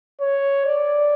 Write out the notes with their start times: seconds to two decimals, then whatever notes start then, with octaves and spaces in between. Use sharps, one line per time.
0.21 C#5
0.66 D5